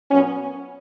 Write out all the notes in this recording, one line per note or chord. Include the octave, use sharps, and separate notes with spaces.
A#2 F#3 B3 C#4